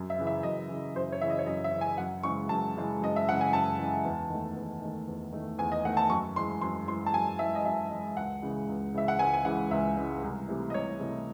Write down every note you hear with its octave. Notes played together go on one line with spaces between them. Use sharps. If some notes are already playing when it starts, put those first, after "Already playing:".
Already playing: F#2
E5
C#3 E3
E5
F#2 D#5
C#3 E3
F#2 C5
C#5
C#3 E3 E5
D#5
C#5
F#2 D#5
E5
C#3 E3
G#5
F#2 F#5
C#3 E3 G#3 C#6
F#2 A5
C#3 E3 G#3
F#2 D#5
E5
C#3 E3 G#3 F#5
G#5
F#2 A5
C#3 E3 G#3
E2
D#3 A3
E2
D#3 A3
E2
D#3 A3
E2 G#5
D#5
D#3 A3 F#5
A5
F#2 C#6
E3 G#3 C6
F#2 C6
E3 G#3 C6
A5
F#2 G#5
E3 G#3 E5
D#5
F#2 E5
E3 G#3
C#2 F#5
C#3 E3 G#3
C#2
C#3 E3 G#3 E5
F#5
C#2 G#5
G#5
C#3 E3 G#3 F#5
C#2 E5
C#3 E3 G#3
C2
C3 E3 A3
D#5
C2 C#5
C3 E3 A3